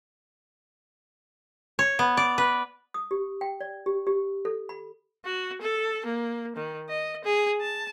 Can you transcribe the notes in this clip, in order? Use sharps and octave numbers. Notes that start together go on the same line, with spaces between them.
C#5
B3
D5
B4
D#6
G4
G5
D5
G4
G4
A4
B5
F#4
A4
A#3
D#3
D#5
G#4
A5